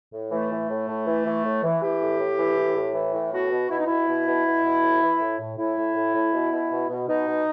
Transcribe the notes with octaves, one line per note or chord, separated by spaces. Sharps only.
A2
E3 A3
E3
A2
A2
E3
E3
A2
E3
E3 G4
A2
A2
E3
A2
A2
E3
A2
B2 F#4
B2
B2 E4
D#4
B2 E4
B2
B2
B2
B2
A2
E3
A2
A2
A2 E4
A2
A2
A2
B2
B2
B2
B2
B2 D#4
B2